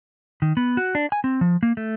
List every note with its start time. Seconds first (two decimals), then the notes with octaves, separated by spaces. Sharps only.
0.42 D#3
0.57 B3
0.77 F#4
0.95 D4
1.12 G#5
1.24 C4
1.41 F3
1.63 A#3
1.77 A3